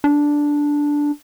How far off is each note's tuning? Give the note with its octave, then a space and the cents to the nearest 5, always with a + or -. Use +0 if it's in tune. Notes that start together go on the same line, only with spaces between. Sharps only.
D4 -5